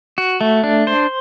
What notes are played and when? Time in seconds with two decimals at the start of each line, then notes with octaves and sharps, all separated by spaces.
0.18 F#4
0.41 A3
0.64 D4
0.87 C5